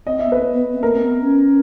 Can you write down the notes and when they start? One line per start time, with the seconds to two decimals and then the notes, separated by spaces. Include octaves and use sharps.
0.06 C4 D#5
0.19 E5
0.25 B3
0.32 B4
0.54 B3
0.73 C4
0.82 A#3 A#4
0.93 C4
1.01 B3
1.21 C#4